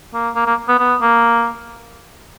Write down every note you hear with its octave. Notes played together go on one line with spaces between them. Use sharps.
A#3
A#3
A#3
B3
B3
A#3